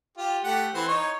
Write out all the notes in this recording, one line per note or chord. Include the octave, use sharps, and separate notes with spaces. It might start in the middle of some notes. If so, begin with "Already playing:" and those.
F4 G4
A3 G4 F#5
E3 C4 C5
D#4 C#5